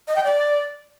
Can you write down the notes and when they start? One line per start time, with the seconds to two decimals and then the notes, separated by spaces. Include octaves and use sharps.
0.08 D#5
0.16 G5
0.24 D5